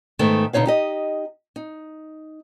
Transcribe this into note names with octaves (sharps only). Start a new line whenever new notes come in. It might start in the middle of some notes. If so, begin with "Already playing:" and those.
G#2 D#3 A3 B3
B2 D3 D#4 C#5 F5
D#4 G4 D#5
D#4